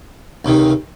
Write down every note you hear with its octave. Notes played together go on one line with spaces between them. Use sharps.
C#2 C3 D#3